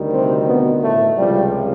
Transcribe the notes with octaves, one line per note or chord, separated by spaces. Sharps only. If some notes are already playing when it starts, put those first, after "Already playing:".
Already playing: D2 D#3 G3
C3 C4
B2 B3
A2 A3
C#2 C3 F3 G3